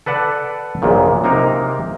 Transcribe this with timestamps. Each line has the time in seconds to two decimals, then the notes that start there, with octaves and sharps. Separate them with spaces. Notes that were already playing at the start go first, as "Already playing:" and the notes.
0.06 A4 B4 D5 F#5 A5
0.82 A#1 F#2 A#2 C#3
1.24 C3 A#3 D#4 A#4